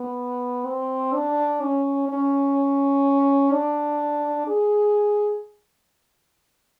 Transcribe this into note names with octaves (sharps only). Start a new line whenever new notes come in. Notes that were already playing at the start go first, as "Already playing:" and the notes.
Already playing: B3
C4
D4
C#4
C#4
D4
G#4